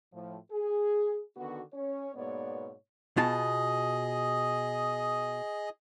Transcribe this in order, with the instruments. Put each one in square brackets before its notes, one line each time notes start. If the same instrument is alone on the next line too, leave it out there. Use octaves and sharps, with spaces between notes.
[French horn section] A2 F3
G#4
D3 D#3 B3 F#4
C#4 C#5
G#2 B2 A#3 B3 C#5 D5
[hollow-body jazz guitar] B2 F4 A5 [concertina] G#4 D#5